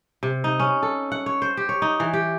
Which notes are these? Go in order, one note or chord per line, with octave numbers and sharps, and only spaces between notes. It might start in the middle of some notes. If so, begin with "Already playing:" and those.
C3
D#4
C#4
A4
F#5
C#5
C5
G4
C#5
D#4
E3
G4